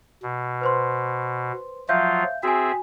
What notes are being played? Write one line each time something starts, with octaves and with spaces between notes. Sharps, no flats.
B2
B4 C5 C6
F3 F#3 F4 E5 F5 G6
C4 F#4 G#4 E5 G#5